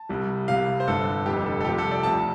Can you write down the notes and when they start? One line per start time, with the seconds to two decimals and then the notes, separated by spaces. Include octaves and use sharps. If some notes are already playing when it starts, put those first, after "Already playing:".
Already playing: A5
0.09 C2 C3 G3
0.48 C2 C3 G3 F5
0.80 C5
0.87 G1 G2 D3 A4
1.26 F1 F2 D3 G3 G4
1.46 A4
1.61 A4
1.64 C2 C3 F3 G4
1.78 A4
1.91 D5
2.03 D2 C3 F3 A5